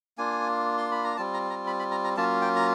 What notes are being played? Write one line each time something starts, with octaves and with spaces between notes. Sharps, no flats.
A#3 D4 F4 G#5
C6
B5
A#5
G3 C4 F4 A5
A#5
A#5
B5
B5
A#5
A#5
F#3 A#3 C#4 F4 A5
G5
A#5